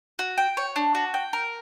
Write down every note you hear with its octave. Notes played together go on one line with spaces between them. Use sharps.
F#4
G5
C#5
D4
F#4
G5
A#4